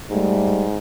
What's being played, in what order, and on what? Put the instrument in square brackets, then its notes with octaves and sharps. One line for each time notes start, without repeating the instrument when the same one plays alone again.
[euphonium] G#2 [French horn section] G3 A3